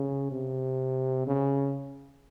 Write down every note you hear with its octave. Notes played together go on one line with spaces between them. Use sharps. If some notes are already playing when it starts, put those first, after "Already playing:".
Already playing: C#3
C3
C#3